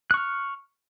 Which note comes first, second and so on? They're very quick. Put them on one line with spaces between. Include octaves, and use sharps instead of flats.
F#6 C#6 F6